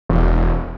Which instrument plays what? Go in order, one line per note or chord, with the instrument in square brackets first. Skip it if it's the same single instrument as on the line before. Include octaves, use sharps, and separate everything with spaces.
[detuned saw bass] E1